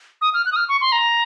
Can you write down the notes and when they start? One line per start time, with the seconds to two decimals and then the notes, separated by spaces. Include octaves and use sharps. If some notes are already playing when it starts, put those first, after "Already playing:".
0.21 D#6
0.34 F6
0.46 F#6
0.52 D#6
0.56 F6
0.69 C#6
0.81 C6
0.92 A#5